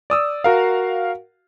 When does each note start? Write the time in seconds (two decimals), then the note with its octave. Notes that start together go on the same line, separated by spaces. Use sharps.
0.10 D5 D#6 E6
0.44 F#4 A#4 F5